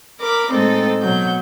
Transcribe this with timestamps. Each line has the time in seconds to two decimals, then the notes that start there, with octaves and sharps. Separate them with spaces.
0.21 A#4 B5 D6
0.51 A2 G#3 C4 D#4 A4
1.01 B2 F#3 G6